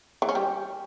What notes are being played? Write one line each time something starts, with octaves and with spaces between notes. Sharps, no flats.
E3
C#4
G3